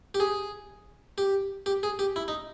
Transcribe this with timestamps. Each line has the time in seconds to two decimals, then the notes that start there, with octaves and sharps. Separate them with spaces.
0.14 G4
0.20 G#4
1.18 G4
1.66 G4
1.83 G#4
1.99 G4
2.16 E4
2.28 D#4